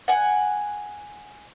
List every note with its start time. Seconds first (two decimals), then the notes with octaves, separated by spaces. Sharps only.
0.08 F#5 G#5